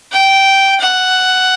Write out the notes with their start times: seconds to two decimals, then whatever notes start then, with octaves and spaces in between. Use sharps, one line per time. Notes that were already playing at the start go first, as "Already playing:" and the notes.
0.12 G5
0.80 F#5